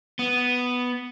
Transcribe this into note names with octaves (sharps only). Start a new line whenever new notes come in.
B3